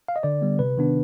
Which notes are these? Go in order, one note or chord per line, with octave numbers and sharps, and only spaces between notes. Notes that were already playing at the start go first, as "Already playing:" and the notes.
F5
D#5
D3 D5
G3 B3
C3 B4
D#3 B3 D4